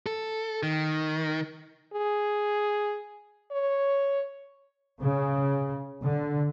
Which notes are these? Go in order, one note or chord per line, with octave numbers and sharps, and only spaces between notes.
A4
D#3
G#4
C#5
C#3
D3